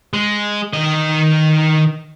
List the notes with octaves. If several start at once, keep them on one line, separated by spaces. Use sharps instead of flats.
G#3
D#3 D#5